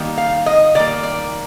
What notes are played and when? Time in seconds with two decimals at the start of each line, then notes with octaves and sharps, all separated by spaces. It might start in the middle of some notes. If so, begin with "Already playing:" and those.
Already playing: D#3 G3 A#3
0.18 F5
0.46 D#5
0.75 D#3 G3 A#3 D5
1.03 D5